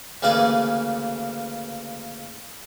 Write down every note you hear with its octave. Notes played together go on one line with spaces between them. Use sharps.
D2 C#3 E3 A#3 D5 G#5